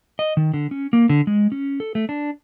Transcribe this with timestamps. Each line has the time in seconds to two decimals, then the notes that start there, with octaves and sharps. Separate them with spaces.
0.19 D#5
0.37 D#3
0.54 D3
0.71 C#4
0.93 A#3
1.09 D3
1.27 G#3
1.52 C#4
1.80 A4
1.95 A3
2.09 D4